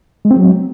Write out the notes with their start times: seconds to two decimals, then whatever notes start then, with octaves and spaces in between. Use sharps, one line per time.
0.25 G#3
0.31 C4
0.36 F#3